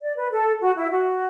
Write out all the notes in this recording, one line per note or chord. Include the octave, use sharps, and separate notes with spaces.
D5
B4
A4
F#4
E4
F#4